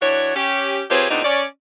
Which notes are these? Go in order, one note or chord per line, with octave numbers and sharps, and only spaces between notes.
E3 D4 F#4 C#5
C#4 G4
F3 C4 G4 G#4 B4 C#5
E2 A#2 B3 C4 D4 D#4
C#4 C#5 D5